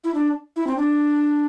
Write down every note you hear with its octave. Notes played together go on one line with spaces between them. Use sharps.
E4
D4
E4
C4
D4